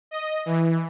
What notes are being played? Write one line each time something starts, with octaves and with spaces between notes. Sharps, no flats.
D#5
E3